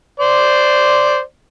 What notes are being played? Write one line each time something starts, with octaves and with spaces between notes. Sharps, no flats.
C5 D5